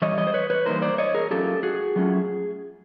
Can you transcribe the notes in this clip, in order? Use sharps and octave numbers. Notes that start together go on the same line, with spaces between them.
E3 G3 C#5 D#5
C#5 D#5
C5
B4 C#5
B4 C#5
E3 G3 A#3 D#4 A#4 C5
C5 D5
C#5 D#5
G#4 A#4
F#3 A3 C#4 F4 G4 A4
F#4 G#4
F#3 A3 C#4 F4